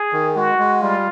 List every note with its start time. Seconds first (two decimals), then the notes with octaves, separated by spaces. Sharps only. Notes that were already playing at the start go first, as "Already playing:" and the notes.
Already playing: G#4
0.12 D#3
0.36 G#3 F#4
0.59 G#3
0.81 G3 F4